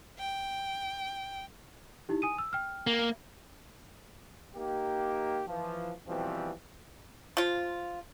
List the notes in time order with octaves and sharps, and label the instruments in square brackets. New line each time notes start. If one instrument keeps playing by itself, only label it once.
[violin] G5
[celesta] D#4 E4 G4
G#5 D#6 D#7
E6
G5 F6
[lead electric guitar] A#3
[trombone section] A#3 D#4 G4
E3 F3
B2 E3 F3 G3 C4
[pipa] F3 F4